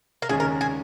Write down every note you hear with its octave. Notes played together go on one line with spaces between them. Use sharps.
A#4
D#2 C#3 G#3 C#4 G#4
A#4
G#4